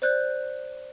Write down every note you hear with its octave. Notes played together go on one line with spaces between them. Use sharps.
C5 D5 F#6 G6